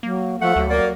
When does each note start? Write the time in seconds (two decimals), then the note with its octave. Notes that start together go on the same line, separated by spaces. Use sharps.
0.03 F#3 A#3
0.42 F3 A3 F#5
0.56 D2 F#3
0.70 A#3 D5